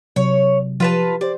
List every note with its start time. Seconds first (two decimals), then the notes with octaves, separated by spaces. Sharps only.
0.16 C3 F#3 C#5
0.80 F3 F4 G4 B4 A5
1.21 G4 C5 D5